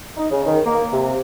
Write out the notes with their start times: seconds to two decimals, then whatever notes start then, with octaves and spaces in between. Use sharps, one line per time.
0.17 D#4
0.31 C#3
0.46 D#3
0.66 A#3
0.92 C3